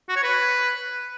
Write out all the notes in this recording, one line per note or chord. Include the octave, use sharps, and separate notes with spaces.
F#4
C#5
B4